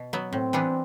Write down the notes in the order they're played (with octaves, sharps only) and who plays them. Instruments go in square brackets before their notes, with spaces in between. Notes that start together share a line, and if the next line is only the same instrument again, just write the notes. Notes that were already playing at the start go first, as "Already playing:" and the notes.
Already playing: [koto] B2
F#3 B3
[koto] A2 [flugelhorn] C4
[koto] E3 G3 B3 D4